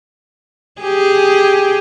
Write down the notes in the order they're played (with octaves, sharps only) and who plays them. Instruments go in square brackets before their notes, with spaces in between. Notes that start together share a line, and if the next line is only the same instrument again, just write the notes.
[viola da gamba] G4 G#4